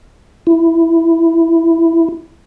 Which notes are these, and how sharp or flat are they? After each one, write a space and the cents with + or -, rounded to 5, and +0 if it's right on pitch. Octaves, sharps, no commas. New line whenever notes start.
E4 +5